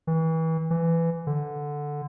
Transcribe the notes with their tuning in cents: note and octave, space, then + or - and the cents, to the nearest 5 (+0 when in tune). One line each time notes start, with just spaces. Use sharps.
E3 -30
E3 +15
D3 +0